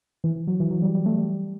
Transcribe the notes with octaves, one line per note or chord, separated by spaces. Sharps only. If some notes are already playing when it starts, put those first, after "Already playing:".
E3
F#3
E3
F#3
G3
G3
A3
G3